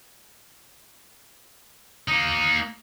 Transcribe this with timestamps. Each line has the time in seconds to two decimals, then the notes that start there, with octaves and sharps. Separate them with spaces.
2.08 A#3 D#4